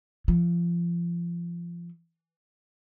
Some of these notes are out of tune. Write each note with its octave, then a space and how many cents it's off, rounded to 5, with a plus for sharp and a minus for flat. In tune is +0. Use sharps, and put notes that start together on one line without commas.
F3 -25